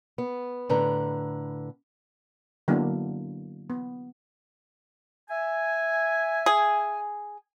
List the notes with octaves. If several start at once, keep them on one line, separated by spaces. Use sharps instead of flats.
B3
A2 D3 B4 A#5
D3 F#3 A#3 B3 D4 E4
B3
E5 G#5
G#4